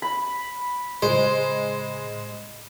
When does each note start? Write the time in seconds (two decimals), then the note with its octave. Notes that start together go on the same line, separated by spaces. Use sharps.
0.02 B5
1.02 A2 C#3 G#3 C5